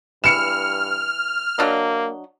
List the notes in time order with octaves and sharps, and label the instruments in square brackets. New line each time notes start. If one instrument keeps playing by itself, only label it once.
[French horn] G2 [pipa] E3 [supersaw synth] F6 [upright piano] C#7 E7
[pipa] F#3 D4 D#5 [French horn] A#3